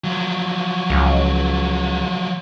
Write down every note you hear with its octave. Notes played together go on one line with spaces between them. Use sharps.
F3 F#3
C#2